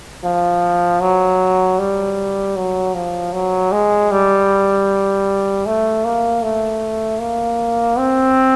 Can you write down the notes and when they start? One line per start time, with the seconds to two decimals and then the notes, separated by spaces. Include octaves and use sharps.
0.24 F3
1.01 F#3
1.79 G3
2.56 F#3
2.95 F3
3.33 F#3
3.72 G#3
4.11 G3
5.66 A3
6.04 A#3
6.42 A3
7.20 A#3
7.98 C4